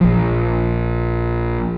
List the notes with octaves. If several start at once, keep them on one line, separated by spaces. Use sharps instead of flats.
A#1 F3